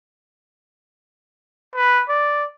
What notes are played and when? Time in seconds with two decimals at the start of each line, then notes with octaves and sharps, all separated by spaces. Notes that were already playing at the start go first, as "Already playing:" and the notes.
1.76 B4
2.09 D5